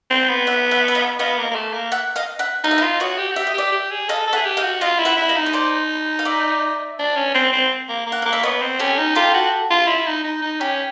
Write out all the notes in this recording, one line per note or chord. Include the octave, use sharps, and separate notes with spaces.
C4
B3
E5 F#5
E5 F#5
E5
D#5 F5
B3 D#5 F5
A#3
A#3
A3
A#3
E5 F#5
D#5 F5
E5 F#5
D#4 F5
E5
D#5 F5
F4
F#4 C#5 D#5
G4
F#4
G4 E5
D#5
G4 D5 E5
G4
G#4
A4 D#5 F5
A4
E5 F#5
G#4
G4
D#5 F5
F#4
F4 D#5 F5
E4
E5 F#5
E4
D#5 F5
D#4
D#5
C5 D5
F5
D5 E5
D4
C#4
C4
C4
A#3
A#3
F#5
A#3 F5
E5
B3 C#5 D#5
C4
C#4 G4 A4
D#4
F4 G4 A4
F#4
F4
E4
D#4
D#4
D#4
C#4 G4